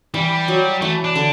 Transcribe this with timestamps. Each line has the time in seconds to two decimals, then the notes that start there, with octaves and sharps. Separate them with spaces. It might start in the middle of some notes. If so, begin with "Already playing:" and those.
0.14 E3 G3
0.48 F#3
0.81 E3 A3
1.04 D4
1.16 D3